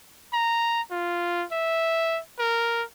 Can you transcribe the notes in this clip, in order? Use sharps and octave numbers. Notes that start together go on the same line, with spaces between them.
A#5
F4
E5
A#4